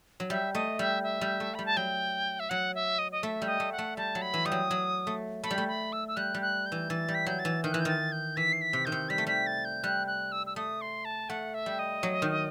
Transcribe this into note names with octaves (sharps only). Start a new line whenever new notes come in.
F#3
G3 E5
A3 D#5
G3 E5
E5
G3
A3
G3 B5
A5
F#3 G5
E5
F#3 F#5
E5
D#5
D#5
A3 E5
G3
D#5
A3
F#5
A3
G3 A5
F#3
B5
E3
G3 D#6
F#3
F#3
A3
A3 B5
G3
A3
B5
E6
E6
G3 F#6
G3
F#6
G6
E3
E3 A6
G3
B6
F#3 G6
A6
E3
D#3 G6
E3 F#6
G6
D#3 A6
G6
E3 B6
C7
B6
C3
D#3 G6
C3
G3 B6
A3
G3 B6
A6
G6
G3 F#6
F#6
E6
E6
A3 D#6
C6
A5
A3 F#5
E5
G3
D#5
F#3
D#3